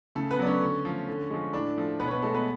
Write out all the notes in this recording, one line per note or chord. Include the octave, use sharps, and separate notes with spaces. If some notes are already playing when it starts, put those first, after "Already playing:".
C#3 A3 A4
B3 B4
F#3 A3 D5
C#4 C#5
D3
F3 A3
D3
F3 G#3
A2 D4 D5
F3 A3
B2 B3 B4
C#5
B3 B4
G#3 A3 A4
B3 B4